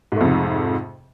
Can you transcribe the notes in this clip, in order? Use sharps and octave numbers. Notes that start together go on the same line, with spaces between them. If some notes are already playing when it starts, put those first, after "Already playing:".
F2 G#2 C3 A3